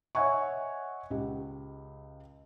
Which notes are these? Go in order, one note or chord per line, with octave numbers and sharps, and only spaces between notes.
C#5 D#5 E5 F#5 G#5 C#6
C#2 G4